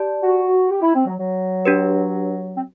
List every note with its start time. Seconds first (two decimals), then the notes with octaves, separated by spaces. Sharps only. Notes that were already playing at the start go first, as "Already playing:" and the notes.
Already playing: G4 D5 A5
0.22 F#4
0.70 G4
0.82 E4
0.94 C4
1.06 F#3
1.18 F#3
1.66 D4 G4 B4
2.55 C4